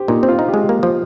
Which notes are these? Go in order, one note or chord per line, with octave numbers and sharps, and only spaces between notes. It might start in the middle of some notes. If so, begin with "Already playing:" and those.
Already playing: G4 C5
A#2 D#4
C4
F4
D#4
G4
G#3
A#3
F3